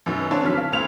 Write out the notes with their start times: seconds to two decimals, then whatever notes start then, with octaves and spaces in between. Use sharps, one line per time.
0.06 F#2 B2 D#3
0.31 B3 C4 D4 B4 C#5 D5
0.43 D3 F#3 F6 B6
0.57 F5
0.72 D2 C4 G#6 F7